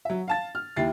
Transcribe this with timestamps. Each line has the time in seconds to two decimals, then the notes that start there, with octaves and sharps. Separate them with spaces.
0.05 F#3 E5
0.28 F5 A5 A6
0.55 F6
0.76 D#2 E4 A6 C7